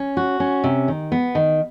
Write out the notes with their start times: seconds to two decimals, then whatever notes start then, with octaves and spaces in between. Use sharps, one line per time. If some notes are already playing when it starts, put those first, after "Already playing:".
Already playing: C#4
0.17 F#4
0.40 C#4
0.64 C3
0.88 D#3
1.12 B3
1.35 D#3